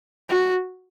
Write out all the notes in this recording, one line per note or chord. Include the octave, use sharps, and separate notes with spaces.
F#4